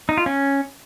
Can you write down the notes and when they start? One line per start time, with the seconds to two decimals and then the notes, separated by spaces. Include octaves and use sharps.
0.09 D#4
0.17 F4
0.26 C#4